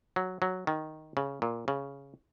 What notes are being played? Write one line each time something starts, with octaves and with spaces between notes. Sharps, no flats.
F#3
F#3
D#3
C#3
A#2
C#3